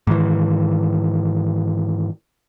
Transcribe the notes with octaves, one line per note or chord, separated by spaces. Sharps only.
G#2 D#3 E3